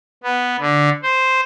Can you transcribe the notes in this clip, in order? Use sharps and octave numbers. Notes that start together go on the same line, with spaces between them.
B3
D3
C5